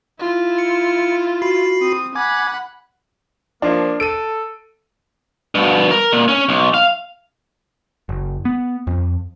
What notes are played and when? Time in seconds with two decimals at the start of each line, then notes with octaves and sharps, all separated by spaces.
0.19 E4 F4
0.58 C#7
1.42 F#4 B5 C7
1.80 C4 D#6
2.15 F#5 G#5 B5 D6 G#6
3.62 F3 A#3 D4
4.00 A4 D7 D#7
5.55 G2 B2
5.91 A#4
6.12 A#2
6.28 C#4
6.49 B1
6.74 F5
8.09 F#1
8.45 B3
8.87 F2